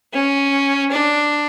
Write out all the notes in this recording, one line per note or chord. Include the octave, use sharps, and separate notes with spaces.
C#4
D4